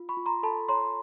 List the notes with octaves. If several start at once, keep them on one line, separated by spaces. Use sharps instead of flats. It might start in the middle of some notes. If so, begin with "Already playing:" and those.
Already playing: F4
B5 C#6
F4
A#5 C6
A4 A5 B5
C#5 A#5 C6